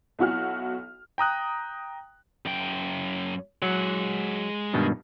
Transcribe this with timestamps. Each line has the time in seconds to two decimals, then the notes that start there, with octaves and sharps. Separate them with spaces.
0.19 B1 E4 F#4 F6
1.18 G5 A#5 D#6 F#6
2.46 F#2 G5
3.62 F#3 G#3 F#5
4.74 G2 B2 D#3